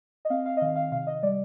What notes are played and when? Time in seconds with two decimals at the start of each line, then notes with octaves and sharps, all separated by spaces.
0.25 D#5
0.30 C4 F5
0.46 F5
0.57 D#5
0.61 D#3 F5
0.76 F5
0.91 C3 F5
1.07 D#5
1.23 G3 D5